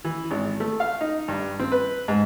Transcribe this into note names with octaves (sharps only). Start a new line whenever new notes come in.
E3
G#1
A3
F5
D#4
G2
C4
B4
G#2